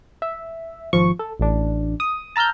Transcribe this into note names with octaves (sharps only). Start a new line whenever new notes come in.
E5
G#1 F3 C#6
A4
A1 D4
D#6
A5 A#5 E6 F6 G6